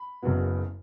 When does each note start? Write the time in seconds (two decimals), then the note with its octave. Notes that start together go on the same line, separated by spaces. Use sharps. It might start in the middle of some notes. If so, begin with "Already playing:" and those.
Already playing: B5
0.22 F#1 F#2 C#3 F#3 B3